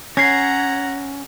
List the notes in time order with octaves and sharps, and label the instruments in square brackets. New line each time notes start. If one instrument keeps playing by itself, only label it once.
[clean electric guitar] C#4 [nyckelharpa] F#5 A#5 [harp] G#6 C7